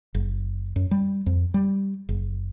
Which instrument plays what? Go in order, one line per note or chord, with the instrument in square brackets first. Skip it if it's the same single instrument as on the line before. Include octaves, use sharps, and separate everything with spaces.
[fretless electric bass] F#1
F#2
G3
F2
G3
F#1